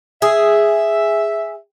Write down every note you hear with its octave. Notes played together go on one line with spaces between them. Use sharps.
G#4 E5